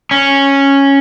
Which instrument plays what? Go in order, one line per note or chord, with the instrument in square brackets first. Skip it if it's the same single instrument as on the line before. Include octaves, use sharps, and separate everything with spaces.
[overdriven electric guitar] C#4